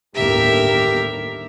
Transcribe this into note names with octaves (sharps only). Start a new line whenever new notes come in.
G1 D#2 A2 G4 A#4 E5